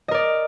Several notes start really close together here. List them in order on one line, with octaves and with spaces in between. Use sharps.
D#5 A#4 D5